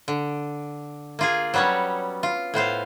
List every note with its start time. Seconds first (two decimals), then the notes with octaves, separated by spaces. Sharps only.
0.08 D3
1.19 A#3 F4 G#4
1.54 F#3 G3 B3 C#4 C#5
2.23 F4
2.54 A2 B3 C5 F5